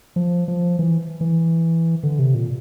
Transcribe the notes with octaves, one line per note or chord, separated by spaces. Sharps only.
F3
F3
E3
E3
D3
C3
A#2